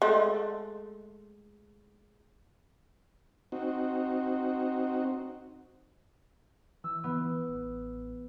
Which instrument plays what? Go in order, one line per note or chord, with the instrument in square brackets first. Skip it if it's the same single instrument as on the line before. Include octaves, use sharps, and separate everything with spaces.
[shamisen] G#3 A3
[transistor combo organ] C4 D#4 F#4
[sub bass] E3 [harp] E6
[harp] B3
[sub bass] A1